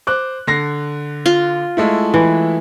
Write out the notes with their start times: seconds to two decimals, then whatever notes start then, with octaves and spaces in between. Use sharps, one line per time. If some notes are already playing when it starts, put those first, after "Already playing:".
0.07 C5 D6 F#6
0.47 D3 A#6 C7
1.26 F4
1.77 G#3 A3 E4
2.14 E3